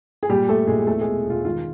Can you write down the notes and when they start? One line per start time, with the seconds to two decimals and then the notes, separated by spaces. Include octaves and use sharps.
0.23 G#4
0.29 A#2 G3 G4
0.49 G3 A3 A4
0.67 A#1 G#3 G#4
0.87 E2 A3 A4
1.01 B2 G#3 G#4
1.25 E1 F4
1.45 D#3 F4